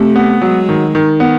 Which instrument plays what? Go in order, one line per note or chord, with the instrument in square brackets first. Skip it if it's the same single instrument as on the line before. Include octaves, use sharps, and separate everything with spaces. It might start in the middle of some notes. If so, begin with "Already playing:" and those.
Already playing: [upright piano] C3 [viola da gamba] A3
[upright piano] B3
[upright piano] F#3 [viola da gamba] G#3
[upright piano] D#3
D#3
B3